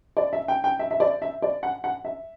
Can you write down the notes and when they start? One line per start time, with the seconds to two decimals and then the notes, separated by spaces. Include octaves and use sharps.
0.17 D5
0.33 E5
0.48 G5
0.64 G5
0.79 E5
0.91 E5
1.00 D5
1.22 E5
1.42 D5
1.63 F#5
1.84 F#5
2.05 E5